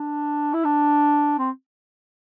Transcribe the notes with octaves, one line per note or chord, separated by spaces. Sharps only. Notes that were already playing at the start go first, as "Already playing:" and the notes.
Already playing: D4
E4
D4
C4